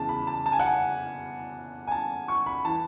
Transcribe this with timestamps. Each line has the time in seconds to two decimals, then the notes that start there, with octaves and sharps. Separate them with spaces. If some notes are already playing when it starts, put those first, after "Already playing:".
Already playing: E2 C#3 E3 A5
0.09 B5
0.27 A5
0.46 A5
0.52 G#5
0.60 F#5
0.67 G#5
1.87 G#5
1.91 A5
2.28 C#6
2.46 B5
2.65 E3 A5